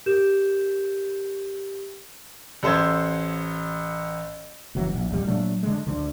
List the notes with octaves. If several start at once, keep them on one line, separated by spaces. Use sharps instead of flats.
G4 A#4 G6 E7
A1 A4 C5 E6 G#6
F#1 E3 F#3
A#1
D#1 G3
A#2 F#3 A3 D4
D3 G#3
D2 D3